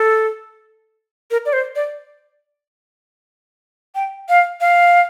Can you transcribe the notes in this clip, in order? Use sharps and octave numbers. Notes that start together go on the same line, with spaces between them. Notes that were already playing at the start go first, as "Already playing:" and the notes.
Already playing: A4
A#4
D5
C5
D5
G5
F5
F5